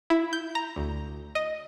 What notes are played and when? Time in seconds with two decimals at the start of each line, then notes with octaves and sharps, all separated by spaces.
0.10 E4
0.33 G6
0.55 A#5
0.76 D2
1.35 D#5